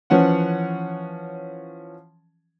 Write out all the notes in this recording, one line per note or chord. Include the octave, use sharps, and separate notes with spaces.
E3 F3 C#4 F#5